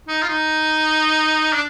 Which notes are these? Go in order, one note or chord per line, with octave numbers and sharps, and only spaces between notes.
D#4
F4
D#4
D4